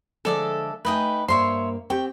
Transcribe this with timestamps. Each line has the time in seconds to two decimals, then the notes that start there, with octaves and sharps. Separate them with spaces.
0.25 D3 F3 G#3 A4 D5 E5
0.85 A3 D#4 B4 D#5 G5 G#5
1.28 G2 A#3 C5 C#5 E5 C6
1.90 C4 G4 G5 C#6